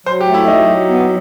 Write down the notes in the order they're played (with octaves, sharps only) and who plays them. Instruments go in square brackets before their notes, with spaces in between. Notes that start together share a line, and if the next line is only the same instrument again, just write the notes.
[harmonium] F#3 [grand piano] C5
[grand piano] G4
[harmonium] A3
[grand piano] E4
[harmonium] F#3 [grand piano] D#4
[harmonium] F#3
B3